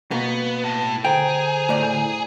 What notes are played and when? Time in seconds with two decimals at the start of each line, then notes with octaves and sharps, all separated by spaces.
0.11 B2 A#3 B3
0.64 A2
1.05 D3 G#4 C5 G5 A#5
1.69 A2 D5